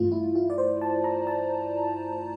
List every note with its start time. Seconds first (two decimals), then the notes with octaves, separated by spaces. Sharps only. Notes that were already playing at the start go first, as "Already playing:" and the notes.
Already playing: G2 E3 A3 F4
0.12 E4
0.35 F4
0.50 D5
0.58 C5
0.81 A5
1.04 A#5
1.27 A5